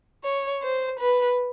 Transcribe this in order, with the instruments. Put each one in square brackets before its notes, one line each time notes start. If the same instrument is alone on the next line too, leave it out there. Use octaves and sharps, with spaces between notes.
[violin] C#5
C5
B4